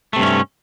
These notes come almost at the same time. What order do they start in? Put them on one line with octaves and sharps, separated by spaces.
A3 C3 G2 C#4